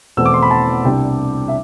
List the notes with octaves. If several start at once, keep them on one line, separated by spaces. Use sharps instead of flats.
E2 B2 A3 C4 E6
D6
C6
B5
A5
C2 C3 G3 D4 G5
E5